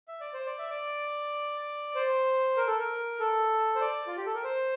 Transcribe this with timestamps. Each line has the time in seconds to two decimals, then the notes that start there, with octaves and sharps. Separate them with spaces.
0.08 E5
0.21 D5
0.33 C5
0.46 D5
0.58 E5
0.70 D5
1.95 C5
2.57 A#4
2.67 A4
2.79 A#4
3.20 A4
3.75 C5
3.81 D5
4.07 F4
4.17 G4
4.26 A4
4.34 A#4
4.44 C5